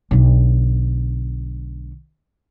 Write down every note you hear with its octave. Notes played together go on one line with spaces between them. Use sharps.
B1 D3